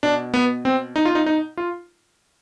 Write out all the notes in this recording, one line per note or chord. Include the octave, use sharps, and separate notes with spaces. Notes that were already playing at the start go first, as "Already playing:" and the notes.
B2 D4
B3
C4
D#4
F4
D#4
D#4
F4